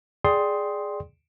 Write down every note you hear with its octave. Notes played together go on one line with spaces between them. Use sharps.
G#4 D5 G5 C6 D#6